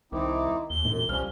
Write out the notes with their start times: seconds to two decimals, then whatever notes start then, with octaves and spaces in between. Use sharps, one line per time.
0.12 C2 D#3 C4 D#4 E4 D6
0.70 D#2 G7
0.85 E1 F#2 A#2
1.09 C2 F3 G3 C#4 F6